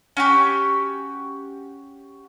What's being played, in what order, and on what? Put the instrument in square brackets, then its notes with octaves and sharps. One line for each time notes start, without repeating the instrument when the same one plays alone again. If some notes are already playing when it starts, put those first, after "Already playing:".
[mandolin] C#4 F#4 G4